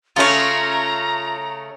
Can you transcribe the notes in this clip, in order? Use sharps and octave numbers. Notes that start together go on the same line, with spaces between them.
C#3 A3 C#4 F4 C#5 A#5